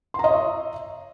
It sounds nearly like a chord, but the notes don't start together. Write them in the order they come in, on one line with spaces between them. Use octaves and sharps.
C6 A#5 D#5 C#5 E5